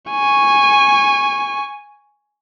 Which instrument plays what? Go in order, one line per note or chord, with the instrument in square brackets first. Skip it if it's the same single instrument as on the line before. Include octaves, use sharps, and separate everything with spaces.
[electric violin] G#5 C#6